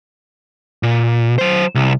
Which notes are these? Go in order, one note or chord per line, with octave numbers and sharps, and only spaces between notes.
A#2
F#3 C5
C2